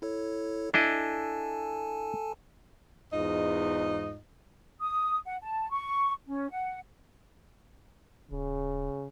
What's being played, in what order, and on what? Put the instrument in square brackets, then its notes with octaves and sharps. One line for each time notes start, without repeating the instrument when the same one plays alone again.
[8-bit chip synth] E4 A4 C#5
[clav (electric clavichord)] D4 E4 D#5 [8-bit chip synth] A4 G#5 A5
[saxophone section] E2 G#2 D#4 F4 D#5
[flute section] D#6
F#5
A5
C#6
C#4
F#5
[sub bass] D#1 [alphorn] C#3